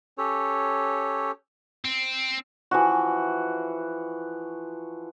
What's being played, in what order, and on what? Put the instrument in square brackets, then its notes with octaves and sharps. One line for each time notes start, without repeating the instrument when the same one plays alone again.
[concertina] C#4 G4 A4 C#5
[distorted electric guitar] C4
[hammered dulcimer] E3 F3 F#4